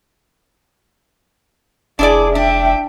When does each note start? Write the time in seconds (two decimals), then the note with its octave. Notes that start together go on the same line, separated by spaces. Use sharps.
1.99 F1 D4 E4 G#4 D5
2.35 D4 E5 G5